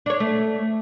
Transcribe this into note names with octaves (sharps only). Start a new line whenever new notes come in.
D4 C#5
A3